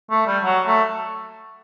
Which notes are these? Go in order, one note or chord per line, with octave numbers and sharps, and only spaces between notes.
A3
G3
F#3
A3